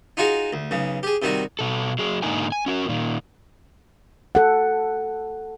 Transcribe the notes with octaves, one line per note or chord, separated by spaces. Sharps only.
D#4 F4 F#4 G#4 F5
D2
B1 C#3
G4 G#4
C3 D#3 G3 F#4
B2 A4
F#3 G#4
G#2 D3 A#3 D#4 A#4 G#5
G#5
C#4 F#4 A#4
A#2 D#3
A4 F#5